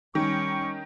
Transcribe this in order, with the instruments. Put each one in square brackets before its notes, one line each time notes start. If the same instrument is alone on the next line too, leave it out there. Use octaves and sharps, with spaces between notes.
[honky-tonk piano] D#3 [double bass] G3 C#4 [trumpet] C#6